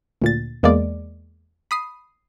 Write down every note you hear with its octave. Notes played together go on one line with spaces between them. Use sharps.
D2 A#2 A6
E2 G#3 A#3 D5
B5 D#6 C7